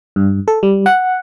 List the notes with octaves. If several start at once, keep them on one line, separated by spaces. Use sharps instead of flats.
G2
A4
G3
F#5